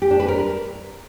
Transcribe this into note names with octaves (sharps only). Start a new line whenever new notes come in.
G4
D4
B4
A#4